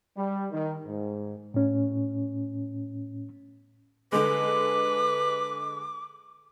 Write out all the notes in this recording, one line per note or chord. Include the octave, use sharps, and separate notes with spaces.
G3
D#3
G#2
A2 C#4
D3 G#3 B4 D6